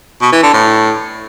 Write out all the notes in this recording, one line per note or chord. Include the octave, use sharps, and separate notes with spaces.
B2
E3
D3
A2